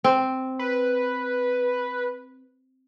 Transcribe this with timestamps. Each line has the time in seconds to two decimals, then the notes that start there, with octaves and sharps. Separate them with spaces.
0.04 C4
0.59 B4